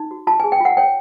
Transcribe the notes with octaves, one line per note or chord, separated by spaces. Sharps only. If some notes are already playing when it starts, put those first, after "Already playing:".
Already playing: D#4
F#4
F4 A5
G#5
G#4
G5
F4 F#5
C#5 G5